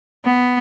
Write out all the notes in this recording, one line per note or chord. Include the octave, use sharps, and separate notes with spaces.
B3